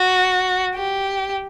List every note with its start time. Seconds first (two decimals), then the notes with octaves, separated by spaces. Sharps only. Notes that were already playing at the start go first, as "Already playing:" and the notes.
Already playing: F#4
0.75 G4